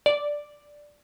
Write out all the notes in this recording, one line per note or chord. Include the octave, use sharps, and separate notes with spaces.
D5